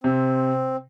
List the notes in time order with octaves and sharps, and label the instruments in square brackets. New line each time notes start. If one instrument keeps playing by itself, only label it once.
[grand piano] C3 [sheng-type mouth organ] C4